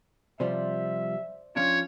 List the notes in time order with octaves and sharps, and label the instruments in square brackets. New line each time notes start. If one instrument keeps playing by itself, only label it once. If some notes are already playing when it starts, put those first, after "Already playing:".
[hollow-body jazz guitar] C3 F3 G3 [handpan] C5 D5 [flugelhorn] E5
[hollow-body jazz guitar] F3 C#4 D4 [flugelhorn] F4 [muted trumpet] C#5